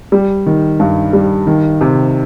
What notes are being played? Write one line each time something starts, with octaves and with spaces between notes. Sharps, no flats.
G3
D#3
G2
G3
D#3
C3